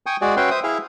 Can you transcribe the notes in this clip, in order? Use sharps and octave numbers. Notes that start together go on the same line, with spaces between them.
G5 G#5 C#6 D#6
G#3 F#4 G#4 D5
C#4 F#4 B4 E5 G5 C6
C5 E5 D#6
E4 G#4 E5 F5